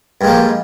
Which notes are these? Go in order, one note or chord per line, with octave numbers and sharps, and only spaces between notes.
G2 F3 G#3 A#3